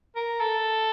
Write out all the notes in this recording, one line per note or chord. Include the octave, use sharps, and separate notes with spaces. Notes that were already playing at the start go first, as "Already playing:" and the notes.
A#4
A4